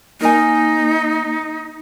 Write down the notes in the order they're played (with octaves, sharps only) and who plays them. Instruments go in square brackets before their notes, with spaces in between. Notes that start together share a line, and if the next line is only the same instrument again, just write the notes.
[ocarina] A#3 [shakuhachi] D#4 [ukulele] A#4 G#5